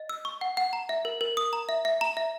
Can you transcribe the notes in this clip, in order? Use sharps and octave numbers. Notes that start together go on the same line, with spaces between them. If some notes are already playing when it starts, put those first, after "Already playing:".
Already playing: D#5
E6
C#6
F#5
F#5
A#5
E5
A#4
A#4
D#6
A#5
E5
E5
A#5
E5